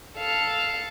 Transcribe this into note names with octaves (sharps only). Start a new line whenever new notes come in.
A4 F5